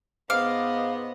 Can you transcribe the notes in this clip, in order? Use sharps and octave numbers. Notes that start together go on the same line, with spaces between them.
G#2 B3 D#5 F5 D6